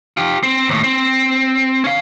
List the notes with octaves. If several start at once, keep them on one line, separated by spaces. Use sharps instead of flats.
F4 G4
C4
D#2 A2
C4
C#4 F5